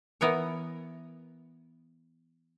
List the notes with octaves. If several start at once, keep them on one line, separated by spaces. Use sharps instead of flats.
E3 B3 A#4 C#5